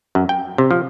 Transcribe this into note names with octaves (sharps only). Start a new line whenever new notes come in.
F#2
G5
C3
F3